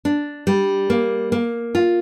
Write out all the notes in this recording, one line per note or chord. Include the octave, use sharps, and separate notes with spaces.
D4
G3
A#3
A#3
F4